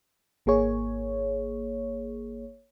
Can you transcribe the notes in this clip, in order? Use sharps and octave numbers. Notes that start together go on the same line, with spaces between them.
G#1 A#3 G#4 C#5